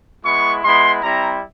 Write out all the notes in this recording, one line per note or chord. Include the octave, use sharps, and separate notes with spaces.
G#3 B3 E4 C#6
G#3 B3 E4 C6
G3 C4 E4 A#5